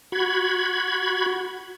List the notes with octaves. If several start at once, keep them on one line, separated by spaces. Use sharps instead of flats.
F#4 B5 G#6